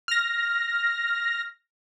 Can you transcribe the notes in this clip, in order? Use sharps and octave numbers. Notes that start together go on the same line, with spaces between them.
F6 A#6